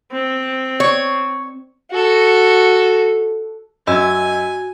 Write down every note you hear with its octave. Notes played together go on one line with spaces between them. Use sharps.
C4
C#5
F#4 A4
F#2 C#4 F#4 D#5 G#5 E6